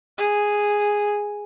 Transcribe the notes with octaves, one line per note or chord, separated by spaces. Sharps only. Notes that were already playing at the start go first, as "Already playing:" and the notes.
G#4